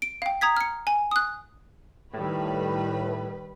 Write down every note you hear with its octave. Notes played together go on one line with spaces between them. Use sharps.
D7
F5 G5
A#5 D#6 G#6 B6
F6 C#7
G#5
D#6 F#6
A2 D#3 G3 B4